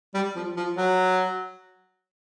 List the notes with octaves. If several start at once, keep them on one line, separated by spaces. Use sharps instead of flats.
G3
F3
F3
F#3